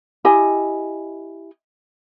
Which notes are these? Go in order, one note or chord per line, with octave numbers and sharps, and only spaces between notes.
E4 G4 D#5 G#5